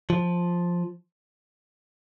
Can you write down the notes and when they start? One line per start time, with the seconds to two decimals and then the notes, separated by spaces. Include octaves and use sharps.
0.10 F3